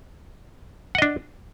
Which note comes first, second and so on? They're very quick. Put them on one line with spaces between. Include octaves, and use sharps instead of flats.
F#5 D#5 D4